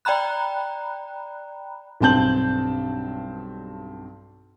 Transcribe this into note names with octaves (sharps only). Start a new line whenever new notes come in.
D5 G5 A#5 B5 F#6
B1 G2 C4 A5 G6 F#7